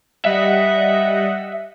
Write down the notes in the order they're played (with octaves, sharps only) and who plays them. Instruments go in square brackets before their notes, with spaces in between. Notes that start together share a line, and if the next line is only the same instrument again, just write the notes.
[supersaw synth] G3 D#5 F#5 [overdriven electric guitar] E5